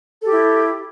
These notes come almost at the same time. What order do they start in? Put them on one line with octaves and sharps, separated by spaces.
A4 G4 E4